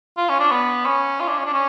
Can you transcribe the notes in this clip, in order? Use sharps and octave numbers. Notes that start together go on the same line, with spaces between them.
F4
C#4
D4
B3
C#4
F4
D4
C#4
D4
C#4